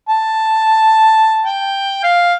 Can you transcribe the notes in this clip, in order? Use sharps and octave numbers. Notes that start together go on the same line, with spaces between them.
A5
G5
F5